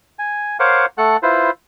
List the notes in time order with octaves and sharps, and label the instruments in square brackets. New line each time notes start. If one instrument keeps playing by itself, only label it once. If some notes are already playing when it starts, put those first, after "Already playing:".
[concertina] G#5
A#4 C5 C#5 F5 F#5 D6
A3 A4 F#5 F#6
E4 F4 B4 C5